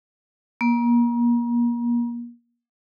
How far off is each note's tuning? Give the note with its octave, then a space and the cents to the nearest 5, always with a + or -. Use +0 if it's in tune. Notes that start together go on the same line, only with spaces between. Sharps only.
A#3 +35